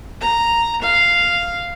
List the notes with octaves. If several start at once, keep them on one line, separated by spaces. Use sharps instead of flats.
A#5
F5